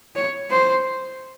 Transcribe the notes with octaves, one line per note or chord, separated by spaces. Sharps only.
C#5
C5